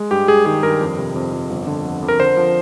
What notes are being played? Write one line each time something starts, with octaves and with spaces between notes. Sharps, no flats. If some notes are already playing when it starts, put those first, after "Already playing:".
Already playing: G#3
G2 G4
G#3 G#4
D#3 G#4
G2 A#4
F2
C3
F2
F2
G1
D3
F2
F2
A#4
D3 C5
F3